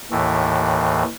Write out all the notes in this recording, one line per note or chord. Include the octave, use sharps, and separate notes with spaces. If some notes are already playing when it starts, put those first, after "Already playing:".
D#2 A2 E3